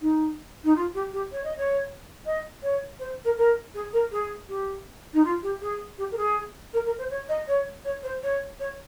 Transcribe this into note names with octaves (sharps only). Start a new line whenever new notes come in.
D#4
D#4
F4
G4
G4
C#5
D#5
C#5
D#5
C#5
C5
A#4
A#4
G#4
A#4
G#4
G4
D#4
F4
G4
G#4
G4
A#4
G#4
A#4
A#4
C5
C#5
D#5
C#5
C#5
C5
C#5
C#5